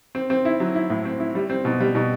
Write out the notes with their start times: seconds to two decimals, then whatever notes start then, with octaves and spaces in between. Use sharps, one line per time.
0.15 C4
0.30 C4
0.45 E4
0.60 F#3
0.75 E4
0.90 A2
1.05 C4
1.20 E4
1.35 G3
1.50 C4
1.65 B2
1.80 G3
1.95 B2